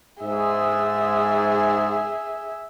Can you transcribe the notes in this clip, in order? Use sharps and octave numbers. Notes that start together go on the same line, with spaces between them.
G#2 G#4 E5